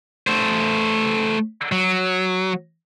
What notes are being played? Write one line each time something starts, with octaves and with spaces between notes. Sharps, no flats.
A3 C5
F#3